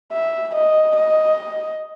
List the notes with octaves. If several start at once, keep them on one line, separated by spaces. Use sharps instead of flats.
E5
D#5
D#5